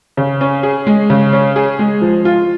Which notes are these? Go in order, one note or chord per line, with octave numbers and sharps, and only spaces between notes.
C#3
C#4
G#4
G#3
C#3
C#4
G#4
G#3
F3
F4